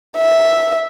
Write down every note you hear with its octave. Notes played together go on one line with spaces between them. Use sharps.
E5